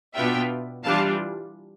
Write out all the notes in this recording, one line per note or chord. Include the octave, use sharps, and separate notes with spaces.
B2 B3 D4 F4 E5 G5
E3 G3 D4 F4 F5 A5